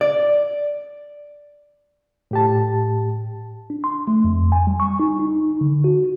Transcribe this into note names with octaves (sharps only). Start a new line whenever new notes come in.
D5
A2 G4 A5
D4
C6
A3
F2
G#5
G3
C#6
D#4
D#4
D3
F#4